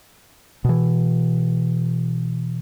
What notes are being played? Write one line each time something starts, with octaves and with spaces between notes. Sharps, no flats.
B2 E3